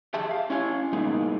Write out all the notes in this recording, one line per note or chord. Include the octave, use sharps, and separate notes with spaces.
G4 G#4 E5 A5
F5
C#4 E4 G#5
A#2 G3 G#3 A#3 B3 D#4